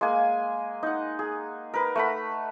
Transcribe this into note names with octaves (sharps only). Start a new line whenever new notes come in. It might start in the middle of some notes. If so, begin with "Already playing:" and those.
G#3 A#3 G#5
D#4 F#5
G#4
A#4 B4
A3 F#5 B5